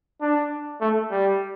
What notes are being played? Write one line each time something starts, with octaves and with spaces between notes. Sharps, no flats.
D4
A3
G3